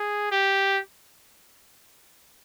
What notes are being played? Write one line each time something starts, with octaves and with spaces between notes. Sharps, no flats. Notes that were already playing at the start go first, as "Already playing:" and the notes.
Already playing: G#4
G4